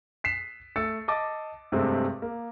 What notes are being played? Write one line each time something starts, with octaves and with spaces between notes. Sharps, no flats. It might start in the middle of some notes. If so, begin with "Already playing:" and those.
B6 C7 E7
A3 E6 A6 C#7
D#5 A5 D6 A6
G2 C3 G#3 A3 C4
A#3